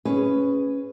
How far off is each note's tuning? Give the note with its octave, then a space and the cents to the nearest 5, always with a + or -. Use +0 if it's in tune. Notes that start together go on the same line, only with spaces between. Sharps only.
C#4 +0 G#4 +0 B4 +5